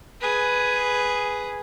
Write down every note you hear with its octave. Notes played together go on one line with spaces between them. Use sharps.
G#4 B4